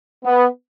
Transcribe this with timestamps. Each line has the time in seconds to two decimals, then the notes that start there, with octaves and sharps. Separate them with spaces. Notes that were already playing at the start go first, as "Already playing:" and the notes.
0.25 B3